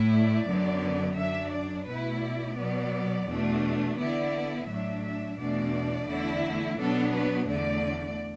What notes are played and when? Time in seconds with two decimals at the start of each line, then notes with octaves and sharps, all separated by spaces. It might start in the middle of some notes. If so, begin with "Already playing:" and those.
Already playing: A2 A3 E4
0.12 D5
0.48 F#2 D3 F#3 B3
1.17 F#2 F#3 D4 E5
1.52 D5
1.87 B2 A3 E4 B4
2.22 D5
2.57 B2 F#3 B3
3.27 E2 B2 A3 D4
3.98 D3 B3 E4 D5
4.67 A2 F#3 D4 E5
5.03 E5
5.37 E2 B2 A3 D4 D5
6.08 E2 D3 A3 E4
6.77 B2 F#3 B3 D4 A4
7.12 B4
7.48 E2 D3 A3 D5